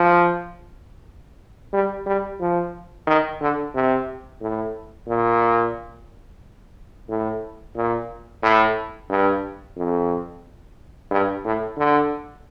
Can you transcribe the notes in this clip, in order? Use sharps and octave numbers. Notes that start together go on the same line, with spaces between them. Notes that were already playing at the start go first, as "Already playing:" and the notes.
Already playing: F3
G3
G3
F3
D#3
D3
C3
A2
A#2
A2
A#2
A2
G2
F2
G2
A2
D3